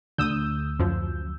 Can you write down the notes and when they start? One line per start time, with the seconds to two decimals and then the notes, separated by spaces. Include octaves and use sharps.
0.18 D2 D3 D#6 E6 G6
0.79 F#2 F3